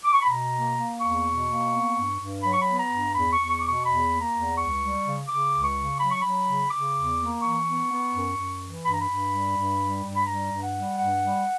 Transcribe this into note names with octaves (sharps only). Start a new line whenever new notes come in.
D6
C#6
B5
B2 A#5
A#3
A#3
E2 C#6
B2
A#3
B3
G2
G2
F#3 B5
C#6
B5
B3
A#5
G2
E2 B5
C#6
E2
C#6
B2 D6
C#6
E2 B5
A#3
A#5
E2
C#2 C#6
G3
C#3
C#3 D6
C#2
C#6
C#3
F#3 B5
C#6
F#3 B5
C#3
C#3 D6
E2
A#3
E3 C#6
B3
B3
F#2
F#2
E3
G2 B5
A#5
B5
G2
G3
G2
G3
G2
B5
G3 A#5
G2
F#5
G3
G2 F#5
G3